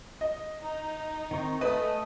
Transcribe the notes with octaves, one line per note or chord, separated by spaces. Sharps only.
D#5
D#4
D#3 C4 C#6
A3 B4 D#5 G#5 A5 D#6